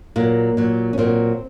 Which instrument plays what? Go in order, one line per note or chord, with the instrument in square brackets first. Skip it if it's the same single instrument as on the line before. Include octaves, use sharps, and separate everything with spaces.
[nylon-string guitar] A#2 F#3 A#3
A#2 F#3
C#4
A#2 F#3 C4